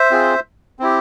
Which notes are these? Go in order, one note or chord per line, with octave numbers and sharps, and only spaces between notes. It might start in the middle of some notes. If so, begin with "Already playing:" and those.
Already playing: C5 E5
C4 F4 G#4
C4 E4 G4